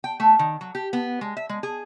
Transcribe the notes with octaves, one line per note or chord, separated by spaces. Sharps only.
G5
A3
D#3
F#3
G4
B3
G#3
E5
G#3
G#4